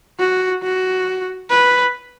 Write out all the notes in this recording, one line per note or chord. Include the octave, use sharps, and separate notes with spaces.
F#4
F#4
B4